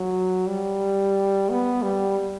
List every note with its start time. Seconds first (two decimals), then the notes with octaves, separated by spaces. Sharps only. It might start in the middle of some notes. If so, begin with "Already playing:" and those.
Already playing: F#3
0.47 G3
1.50 B3
1.83 G3